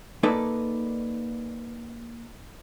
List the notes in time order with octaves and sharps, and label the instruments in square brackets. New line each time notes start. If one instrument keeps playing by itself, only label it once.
[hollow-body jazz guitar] A#3 D#4 A4 B4 D5